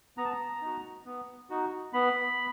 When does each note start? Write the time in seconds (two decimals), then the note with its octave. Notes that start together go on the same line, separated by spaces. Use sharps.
0.18 B3 A#5
0.24 A5
0.32 A#5
0.61 D#4 F#4
1.05 B3
1.50 D#4 F#4
1.93 B3 B5